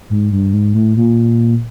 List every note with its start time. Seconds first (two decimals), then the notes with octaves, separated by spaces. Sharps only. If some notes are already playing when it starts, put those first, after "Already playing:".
0.10 G#2
0.32 G2
0.53 G#2
0.74 A2
0.97 A#2